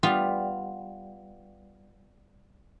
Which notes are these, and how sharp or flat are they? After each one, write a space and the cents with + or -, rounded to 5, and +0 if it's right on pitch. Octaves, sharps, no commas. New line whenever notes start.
G3 +0 B3 +0 F4 +0